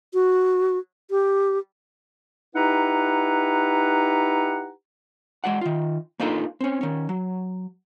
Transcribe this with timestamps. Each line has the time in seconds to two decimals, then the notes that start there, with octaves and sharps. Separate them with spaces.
0.14 F#4
1.11 G4
2.56 D#4 E4 G4 B4 F#5 A#5
5.44 G#3 F#4 D5 F#5
5.61 D#3 F4
6.19 A#3 D4 D#4 F4 A4 B4
6.60 C4 C#4
6.81 D#3 C#4
7.09 F#3